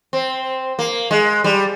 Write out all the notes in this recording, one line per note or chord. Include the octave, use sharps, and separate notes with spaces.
C4
A#3
G#3
G3